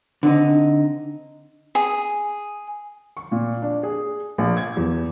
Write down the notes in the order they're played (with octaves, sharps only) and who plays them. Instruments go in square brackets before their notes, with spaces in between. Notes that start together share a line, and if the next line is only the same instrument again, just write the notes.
[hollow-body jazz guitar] D3 C4 D#4
[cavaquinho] G#4
[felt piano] C#6
A#2
D4
G#4
A#1
G#6
E2